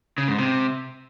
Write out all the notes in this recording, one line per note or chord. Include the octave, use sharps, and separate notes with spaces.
C#3
G#2
C3